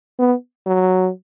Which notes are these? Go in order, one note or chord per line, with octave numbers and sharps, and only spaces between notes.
B3
F#3